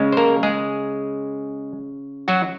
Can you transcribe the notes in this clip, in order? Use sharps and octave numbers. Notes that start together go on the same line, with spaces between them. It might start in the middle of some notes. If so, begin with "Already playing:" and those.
Already playing: C#3 G#3
C5
A#3 A#4
G#3 G#4
F#3 F#4